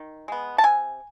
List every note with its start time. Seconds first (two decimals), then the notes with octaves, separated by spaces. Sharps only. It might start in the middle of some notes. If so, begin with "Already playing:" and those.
Already playing: D#3
0.28 G#3 B3
0.58 A5
0.64 C3 G#5